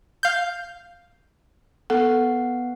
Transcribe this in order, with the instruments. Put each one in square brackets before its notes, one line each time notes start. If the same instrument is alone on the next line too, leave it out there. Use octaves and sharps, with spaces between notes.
[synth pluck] F5 G6
[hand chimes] B3 F#5 [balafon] A4